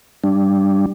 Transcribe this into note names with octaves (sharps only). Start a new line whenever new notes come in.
G3 D4